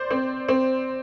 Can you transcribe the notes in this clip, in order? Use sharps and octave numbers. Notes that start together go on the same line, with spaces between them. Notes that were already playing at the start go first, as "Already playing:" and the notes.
Already playing: C5 D5
C4
C4